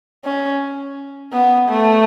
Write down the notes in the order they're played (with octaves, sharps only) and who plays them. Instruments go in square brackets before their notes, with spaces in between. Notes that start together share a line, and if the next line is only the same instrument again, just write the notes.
[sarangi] C#4
B3
A3